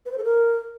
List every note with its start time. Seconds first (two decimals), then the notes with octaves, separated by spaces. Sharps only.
0.06 B4
0.12 C5
0.18 A4
0.24 A#4